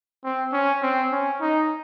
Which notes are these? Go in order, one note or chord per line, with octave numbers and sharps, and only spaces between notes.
C4
C#4
C4
C#4
D#4